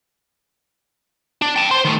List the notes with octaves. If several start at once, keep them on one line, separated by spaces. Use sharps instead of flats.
D4
G5 A5
C5 C6
D#3 A3